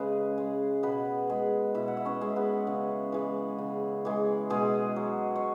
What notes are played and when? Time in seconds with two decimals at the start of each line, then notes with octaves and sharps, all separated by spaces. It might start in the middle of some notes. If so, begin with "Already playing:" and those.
Already playing: C#3 G#3 G#4 B4
0.38 G#3
0.83 B2 B3 B4
1.30 G#3
1.75 B2 E4 E5
1.88 F#5
1.97 E5
2.05 C#4 C#5
2.21 G#3
2.36 B3 B4
2.67 C#3
3.12 E3 G#3
3.58 C#3
4.05 E3 G#3
4.50 B2 G#3 G#4
4.96 F#3
5.36 C#5